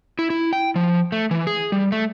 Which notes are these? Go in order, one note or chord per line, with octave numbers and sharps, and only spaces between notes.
E4
E4
G5
F3
A3
E3
G#4
G3
A3